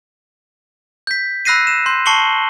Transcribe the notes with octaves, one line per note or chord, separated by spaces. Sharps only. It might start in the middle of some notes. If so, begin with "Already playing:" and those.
G6 B6
B5 E6 F#6 A#6 C7 D#7
E7
C6 G6
A5 C#6 C7 C#7 F#7 G7